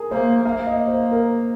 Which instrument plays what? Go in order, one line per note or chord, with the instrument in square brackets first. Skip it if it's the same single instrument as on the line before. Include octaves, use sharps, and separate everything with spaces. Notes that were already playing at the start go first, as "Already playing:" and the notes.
Already playing: [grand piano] G#4 A#4
[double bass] A#3 [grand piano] C5
[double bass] A#3 [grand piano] F5
[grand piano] D#5
C5
A#4